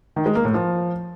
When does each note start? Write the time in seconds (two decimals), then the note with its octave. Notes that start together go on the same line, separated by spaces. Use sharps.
0.16 D#3
0.26 G#3
0.35 A#3
0.45 A2
0.54 F3